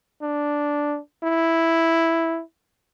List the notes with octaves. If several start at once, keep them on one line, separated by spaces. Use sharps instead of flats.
D4
E4